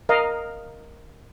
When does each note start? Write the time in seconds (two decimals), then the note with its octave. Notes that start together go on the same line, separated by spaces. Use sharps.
0.09 A#4 D#5 F5